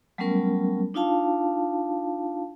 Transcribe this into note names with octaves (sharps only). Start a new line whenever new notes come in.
F#3 G3 A3 B3 C#4 A#4
D4 D#4 F4 F5 A5